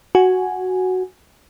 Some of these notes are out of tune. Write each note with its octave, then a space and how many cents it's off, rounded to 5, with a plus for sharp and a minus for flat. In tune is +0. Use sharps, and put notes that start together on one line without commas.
F#4 +0 G#5 +0